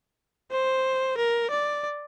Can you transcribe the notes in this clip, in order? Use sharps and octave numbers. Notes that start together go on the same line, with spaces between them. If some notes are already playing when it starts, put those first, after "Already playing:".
C5
A#4
D5